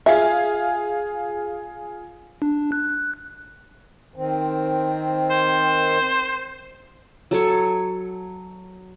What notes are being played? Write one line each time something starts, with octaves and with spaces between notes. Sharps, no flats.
F4 G#4 E5 F5
D4
F#6
D#3 C4
C5
F#3 A4 C#5 C#6